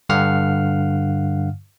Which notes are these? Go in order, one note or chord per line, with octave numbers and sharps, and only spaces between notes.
G2 D3 F5 F#5 F6